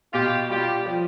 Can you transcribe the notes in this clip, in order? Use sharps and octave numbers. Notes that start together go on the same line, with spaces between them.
B2 F4 G4
G3 F4 G4
F3